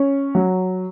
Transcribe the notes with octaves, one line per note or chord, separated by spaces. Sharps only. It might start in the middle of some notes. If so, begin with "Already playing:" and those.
Already playing: C#4
F#3